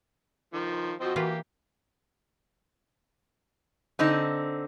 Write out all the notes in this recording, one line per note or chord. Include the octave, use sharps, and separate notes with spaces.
D#3 F3
F3 C4 F#4 D#5
E3 A#3 F4 G4 B4
D3 C4 D#4